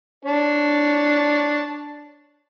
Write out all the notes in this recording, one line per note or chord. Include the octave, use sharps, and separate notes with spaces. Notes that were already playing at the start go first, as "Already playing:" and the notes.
D4 C#5 A5